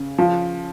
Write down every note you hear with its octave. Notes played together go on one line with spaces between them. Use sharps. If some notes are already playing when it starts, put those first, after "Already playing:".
Already playing: C#3
F3